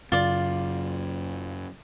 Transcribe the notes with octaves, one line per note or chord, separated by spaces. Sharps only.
F#2 C#3 F4 D5